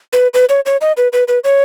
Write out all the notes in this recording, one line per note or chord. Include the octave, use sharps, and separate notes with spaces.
B4
B4
C#5
C#5
D#5
B4
B4
B4
C#5